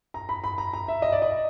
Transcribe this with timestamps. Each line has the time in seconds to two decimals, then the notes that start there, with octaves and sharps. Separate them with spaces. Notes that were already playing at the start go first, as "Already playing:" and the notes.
0.14 A#5
0.29 B5
0.44 B5
0.58 A#5
0.73 A#5
0.88 E5
1.02 D#5
1.12 D5
1.22 D#5